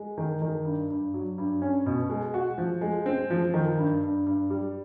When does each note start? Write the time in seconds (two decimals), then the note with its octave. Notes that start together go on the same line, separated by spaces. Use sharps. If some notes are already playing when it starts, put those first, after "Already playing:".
Already playing: G#3
0.18 D#3
0.42 D#3
0.65 G2
0.90 G2
1.14 F#3
1.38 G2
1.62 C#4
1.86 B2
2.10 G#3
2.34 F#4
2.58 F3
2.81 G#3
3.06 C4
3.30 F3
3.54 D#3
3.78 G2
4.03 G2
4.26 G2
4.50 G3